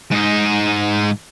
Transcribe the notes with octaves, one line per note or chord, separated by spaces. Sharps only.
G#2 D#4